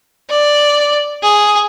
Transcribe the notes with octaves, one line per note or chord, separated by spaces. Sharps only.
D5
G#4